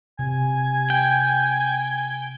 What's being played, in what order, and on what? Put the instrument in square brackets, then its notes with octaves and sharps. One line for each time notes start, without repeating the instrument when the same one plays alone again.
[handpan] C3 [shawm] G#5
[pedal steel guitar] G5